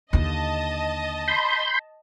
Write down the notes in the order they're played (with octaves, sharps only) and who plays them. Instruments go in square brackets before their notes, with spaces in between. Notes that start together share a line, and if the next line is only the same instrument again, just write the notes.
[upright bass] D#2 D3 [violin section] D#5 A5
[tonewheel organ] B5 C6 G6